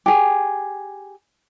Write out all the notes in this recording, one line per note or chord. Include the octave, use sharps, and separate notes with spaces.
G4 G#4